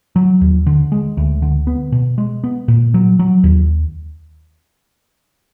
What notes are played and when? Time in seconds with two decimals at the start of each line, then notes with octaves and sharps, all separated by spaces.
0.16 F#3
0.41 D#2
0.66 D3
0.92 G#3
1.17 D2
1.42 D3
1.67 B3
1.92 B2
2.18 G#3
2.44 B3
2.68 A#2
2.94 F#3
3.19 F#3
3.44 D#2